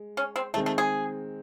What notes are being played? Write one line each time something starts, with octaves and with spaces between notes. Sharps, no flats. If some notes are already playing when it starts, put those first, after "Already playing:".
Already playing: G#3
C#4
C4
D#3 G#3 A3 C4
A3
G#4